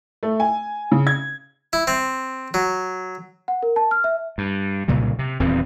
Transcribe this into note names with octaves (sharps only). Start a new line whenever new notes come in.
A3
G#5
C#3
G#6
E4
C4
F#3
F#5
A#4
A5
F6
E5
G2
C2 A#2 C#3 F#3
C3
D#1 E2 E3 C4